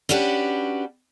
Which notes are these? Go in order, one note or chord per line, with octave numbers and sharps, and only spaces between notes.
C#4 D4 F#4 G4 B4